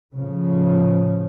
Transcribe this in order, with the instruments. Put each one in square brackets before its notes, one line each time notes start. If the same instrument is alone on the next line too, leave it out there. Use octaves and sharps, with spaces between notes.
[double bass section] A2 C#3 F3